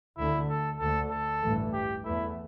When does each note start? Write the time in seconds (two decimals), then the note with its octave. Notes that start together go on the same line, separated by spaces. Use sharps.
0.17 D2 D3 A3 E4
0.49 A4
0.79 D2 D3 A3 A4
1.10 A4
1.43 A1 G2 E3 A3
1.73 G4
2.04 E2 E3 A3 E4